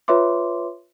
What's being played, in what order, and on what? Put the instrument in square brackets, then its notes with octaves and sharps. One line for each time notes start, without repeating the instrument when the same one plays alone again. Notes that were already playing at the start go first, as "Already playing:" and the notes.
[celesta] F4 B4 C#5 E5 C6 D6